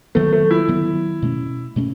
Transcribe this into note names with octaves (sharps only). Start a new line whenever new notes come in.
D#3 F#3 A3 B3
A3
E4
D#3 F#3 B3
B2 A3 C#4
B2 A3 C#4